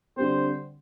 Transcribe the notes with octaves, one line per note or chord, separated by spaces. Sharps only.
D3 G3 C4 C5